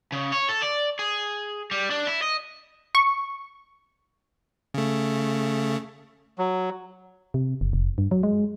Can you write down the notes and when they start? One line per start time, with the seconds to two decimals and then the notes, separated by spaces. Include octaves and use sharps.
0.12 C#3
0.32 C#5
0.49 A4
0.62 D5
0.99 G#4
1.71 G3
1.90 D4
2.07 E4
2.22 D#5
2.95 C#6
4.74 C#3 A3
6.39 F#3
7.34 C3
7.61 F#1
7.73 F1
7.98 G2
8.11 F#3
8.23 G#3